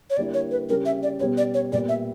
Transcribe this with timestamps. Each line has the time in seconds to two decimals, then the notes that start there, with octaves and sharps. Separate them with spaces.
0.10 C#5
0.17 D3 G3 A#3 E4 D5
0.34 C#5
0.51 B4
0.69 C#3 G3 C#4 A#4
0.85 E5
1.03 D5
1.20 B2 G3 B3 C#5
1.38 D5
1.54 C#5
1.72 A#2 G3 B3 D5
1.89 E5